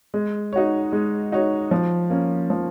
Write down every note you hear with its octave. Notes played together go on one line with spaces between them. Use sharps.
G#3
D#4 F#4 C#5
G#3
D#4 F#4 C#5
F3
A#3 C#4
F3